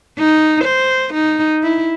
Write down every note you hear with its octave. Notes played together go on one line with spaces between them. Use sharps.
D#4
C5
D#4
E4